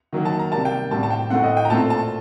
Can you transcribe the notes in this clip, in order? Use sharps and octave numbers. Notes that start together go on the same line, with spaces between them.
D#3 F#3 A#3
A5
A#5
C3 G3 A#3 A5
G5
A2 G3 C4 A5
A5
G5
A2 A3 C4 F#5
D#5
G5
A#5
A#2 A3 C4 A5
A5